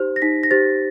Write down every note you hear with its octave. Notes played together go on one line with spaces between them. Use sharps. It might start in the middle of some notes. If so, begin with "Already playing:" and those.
Already playing: D#4 G4 C5
A#6
D#4 B6
A#6
G4 C5 A6